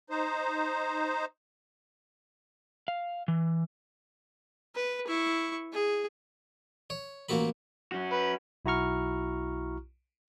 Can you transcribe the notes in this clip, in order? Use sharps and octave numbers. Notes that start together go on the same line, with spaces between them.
D#4 C5
F5
E3
B4
E4 C#6
G#4
C#5
A1 A#3 F#4 A4 B5
C#4 F#4
B4
B1 E4 F#4 A#5 C#6 F6